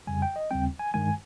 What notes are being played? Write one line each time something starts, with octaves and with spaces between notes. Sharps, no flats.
F2 C#3 G3 G#5
G5
D#5
D#2 C#3 G3 C4 G5
G#5
G2 D#3 G#3 G#5